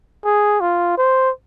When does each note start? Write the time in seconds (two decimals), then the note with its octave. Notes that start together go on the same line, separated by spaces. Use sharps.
0.25 G#4
0.61 F4
0.98 C5